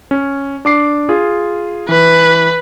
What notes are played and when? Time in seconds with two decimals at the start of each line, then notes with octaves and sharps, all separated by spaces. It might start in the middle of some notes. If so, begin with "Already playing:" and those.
0.11 C#4
0.65 D4 D6 C7
1.09 F4 G#4
1.89 E3 B4